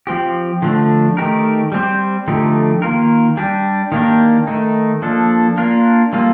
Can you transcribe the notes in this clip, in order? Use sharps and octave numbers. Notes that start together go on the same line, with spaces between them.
F3 C4 G4
D3 F3 A3 D4
D#3 A3 D#4 G4 A#4
G3 C4 G4 C5
D3 F3 A3 D#4 G4
D#3 A#3 F4 A#4
G3 D4 G4
D#3 A#3 D4 G4 A#4
D#3 A3 D#4
F3 A#3 D4 A4
A#3 D4 F4 A#4
G3 A#3 F4 A4